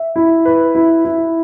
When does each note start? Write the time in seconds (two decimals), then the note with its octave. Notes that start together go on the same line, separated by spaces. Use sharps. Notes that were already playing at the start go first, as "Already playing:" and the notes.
Already playing: E5
0.16 E4
0.45 B4
0.75 E4
1.05 E4